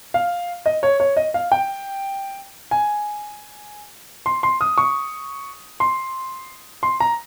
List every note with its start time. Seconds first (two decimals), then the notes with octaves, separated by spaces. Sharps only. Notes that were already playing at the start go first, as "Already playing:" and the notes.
0.14 F5
0.66 D#5
0.83 C#5
1.00 C#5
1.17 D#5
1.34 F5
1.52 G5
2.71 G#5
4.26 C6
4.43 C6
4.61 D#6
4.78 C#6
5.80 C6
6.83 C6
7.00 A#5